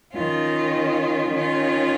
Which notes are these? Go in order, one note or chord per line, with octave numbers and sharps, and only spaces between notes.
D#3 C#4 F4
D#3 C#4 F4